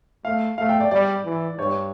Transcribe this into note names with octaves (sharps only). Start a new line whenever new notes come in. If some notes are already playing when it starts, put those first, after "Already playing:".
A3 F5
A3 F5
G5
D5
G3 D5
E3
G2 C#5